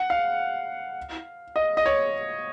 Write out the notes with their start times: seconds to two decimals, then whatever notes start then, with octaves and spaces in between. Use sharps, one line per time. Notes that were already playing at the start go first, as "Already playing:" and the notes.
Already playing: F#5
0.10 F5
1.56 D#5
1.77 D#5
1.86 C#5